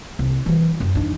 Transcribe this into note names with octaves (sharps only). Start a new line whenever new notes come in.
C2
E3 F#3
F#2
D4 D#4